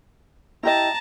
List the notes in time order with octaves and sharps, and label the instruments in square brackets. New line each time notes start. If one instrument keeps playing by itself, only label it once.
[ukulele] E4 G4 D#5 [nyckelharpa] A5 A#5